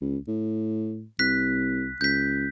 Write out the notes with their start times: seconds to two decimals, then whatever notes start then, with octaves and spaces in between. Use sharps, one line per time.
0.02 C#2
0.28 A2
1.19 C2 F#6 B6
2.01 C#2 G6 B6